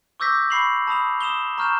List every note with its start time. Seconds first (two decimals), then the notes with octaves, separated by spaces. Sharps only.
0.20 C#6 D6 E6 G6 A#6 B6
0.50 B5 C#6 C7 F7 F#7
0.87 A5 B5 D#6 F7
1.21 D#6 E7 F7 G7
1.58 A#5 C#6 F6 G6 E7